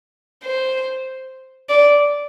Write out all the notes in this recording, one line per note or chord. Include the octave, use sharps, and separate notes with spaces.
C5
D5